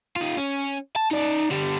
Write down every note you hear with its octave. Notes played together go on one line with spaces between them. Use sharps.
D#4 F4
C#4
A5
D#4 D5
D3 G3